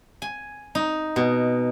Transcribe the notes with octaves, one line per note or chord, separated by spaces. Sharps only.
G#5
D#4
B2